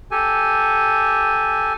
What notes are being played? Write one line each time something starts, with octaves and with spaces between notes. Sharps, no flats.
G4 A4 G#5